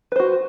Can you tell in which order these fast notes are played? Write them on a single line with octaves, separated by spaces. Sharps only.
B4 C5 F#4